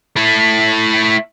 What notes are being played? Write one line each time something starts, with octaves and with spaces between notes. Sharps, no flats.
A3 E4